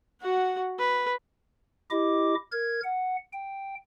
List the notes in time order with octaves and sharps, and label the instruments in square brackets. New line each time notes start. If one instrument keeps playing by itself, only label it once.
[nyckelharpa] F#4 F#5
B4
[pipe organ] E4 G4 D#5 D6
A#4 G#6
F#5
G5